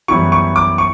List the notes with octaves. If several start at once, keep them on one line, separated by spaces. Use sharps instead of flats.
F#2 E3 G3 B3 E4 C#6
C#6
D6
C#6